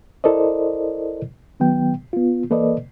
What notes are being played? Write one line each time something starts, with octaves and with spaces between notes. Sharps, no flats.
E4 A4 A#4 C5 D5 D#5
D#3 F#3 B3 G5
B3 F4
E3 A#3 A4 B4 D5 D#5